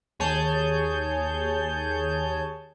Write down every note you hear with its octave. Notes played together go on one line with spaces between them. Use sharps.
D#2 G#4 C#5 G#5 A5 G6